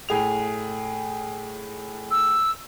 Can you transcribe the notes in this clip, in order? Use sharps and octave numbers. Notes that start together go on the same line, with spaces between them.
A2 G#4 F7
E6